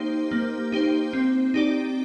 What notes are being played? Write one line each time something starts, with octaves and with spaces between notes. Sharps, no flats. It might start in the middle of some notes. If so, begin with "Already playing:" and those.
Already playing: A#3 D#4 G4 C5
A#3
D#4 G4 C5
C4
D#4 G4 D5